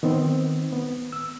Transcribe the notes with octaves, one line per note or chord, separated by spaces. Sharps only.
D#3 B3 C4
B3
E6